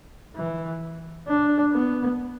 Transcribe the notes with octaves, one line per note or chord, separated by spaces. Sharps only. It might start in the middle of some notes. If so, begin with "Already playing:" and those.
E3
D4
B3